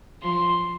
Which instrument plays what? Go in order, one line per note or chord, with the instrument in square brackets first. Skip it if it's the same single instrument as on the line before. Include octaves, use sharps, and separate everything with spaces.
[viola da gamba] F3 [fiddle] C6